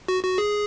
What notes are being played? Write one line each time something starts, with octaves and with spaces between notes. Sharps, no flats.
F#4
F#4
G#4